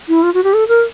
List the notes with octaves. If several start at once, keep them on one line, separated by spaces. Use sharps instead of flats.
E4
F4
F#4
G4
A4
A#4